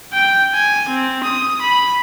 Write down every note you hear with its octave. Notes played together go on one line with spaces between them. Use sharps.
G5
G#5
C4
D#6
B5